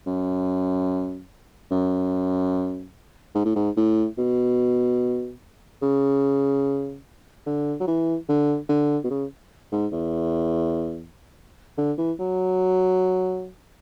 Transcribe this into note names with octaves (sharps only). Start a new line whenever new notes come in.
F#2
F#2
G#2
A2
G#2
A2
B2
C#3
D3
F#3
E3
D3
D3
B2
C#3
G#2
E2
D3
E3
F#3